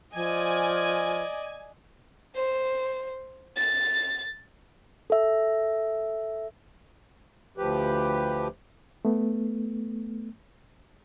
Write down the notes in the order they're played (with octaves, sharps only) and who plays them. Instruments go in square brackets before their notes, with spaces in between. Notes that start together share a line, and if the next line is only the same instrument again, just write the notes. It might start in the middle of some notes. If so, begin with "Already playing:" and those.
[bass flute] F3 [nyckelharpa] D5 D#5 [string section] G#5
[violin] C5
A6
[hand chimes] A4 E5
[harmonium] D2 F3 G4 B4
[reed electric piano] A3 B3